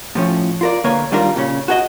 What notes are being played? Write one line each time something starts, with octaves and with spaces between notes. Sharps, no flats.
A2 F3 C#4
F4 A#4 D5
D3 A#3 A#4 B4 C#5
D#3 G3 D4 F4 A#4
A#2 C#3 C#4
F#4 G#4 D#5